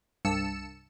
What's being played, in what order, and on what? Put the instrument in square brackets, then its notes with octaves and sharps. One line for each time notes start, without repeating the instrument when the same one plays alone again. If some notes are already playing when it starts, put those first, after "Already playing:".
[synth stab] C2 G2 A5 E6 C#7 E7